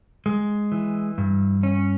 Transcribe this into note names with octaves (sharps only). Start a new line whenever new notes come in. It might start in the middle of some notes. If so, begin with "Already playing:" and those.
G#3
E3
G2
C#4